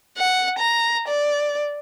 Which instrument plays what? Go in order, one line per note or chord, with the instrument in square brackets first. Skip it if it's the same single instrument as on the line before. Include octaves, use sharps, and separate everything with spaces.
[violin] F#5
A#5
D5